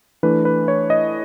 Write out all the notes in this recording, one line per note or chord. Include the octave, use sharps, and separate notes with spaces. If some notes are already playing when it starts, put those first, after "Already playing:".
E3 A3 D4 B4
B4
C#5
D#5